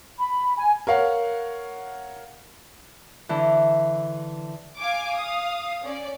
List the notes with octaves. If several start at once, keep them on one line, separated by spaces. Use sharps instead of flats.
B5
G#5
A#4 C#5 F5 F#5
D3 E3
F5 G#5 D6
F5 D#6
C#4 D5